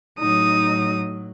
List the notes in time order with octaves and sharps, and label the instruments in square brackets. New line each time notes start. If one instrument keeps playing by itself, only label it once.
[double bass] A2 F#3 [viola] D#4 [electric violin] D#6